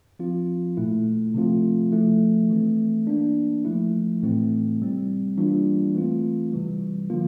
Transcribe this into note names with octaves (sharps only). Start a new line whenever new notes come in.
F3 C4 F4
A#2 A3 E4
C3 F3 A3 C4 F4
F3 A3 E4
E3 A3 C4
E3 A#3 D4
F3 A3 E4
A2 E3 A3 C4 E4
C3 G3 C4
E3 G3 A#3 D4 F4
E3 A3 C4 F4
C3 E3 G3
D3 F3 A#3 F4